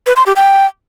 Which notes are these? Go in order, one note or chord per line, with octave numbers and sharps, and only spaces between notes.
B4
C6
G4
G5